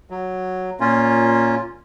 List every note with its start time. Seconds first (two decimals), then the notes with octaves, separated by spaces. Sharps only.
0.10 F#3
0.80 A#2 A#3 C#4 F4